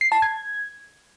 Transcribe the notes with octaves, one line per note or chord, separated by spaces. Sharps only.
C7
A5
G#6